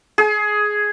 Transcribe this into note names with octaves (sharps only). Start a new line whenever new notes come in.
G#4